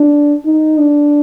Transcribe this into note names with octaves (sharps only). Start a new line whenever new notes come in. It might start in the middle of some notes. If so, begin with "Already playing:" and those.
Already playing: D4
D#4
D4